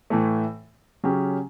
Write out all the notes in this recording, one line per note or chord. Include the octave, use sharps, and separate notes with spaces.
A2 E3 A3
C#3 F#3 C#4 G4